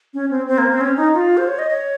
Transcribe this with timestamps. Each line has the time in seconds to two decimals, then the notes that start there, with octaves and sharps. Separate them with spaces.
0.14 C#4
0.31 C4
0.47 C4
0.58 A#3
0.70 C4
0.81 C#4
0.97 D#4
1.14 F4
1.37 C5
1.48 C#5
1.59 D#5
1.70 C#5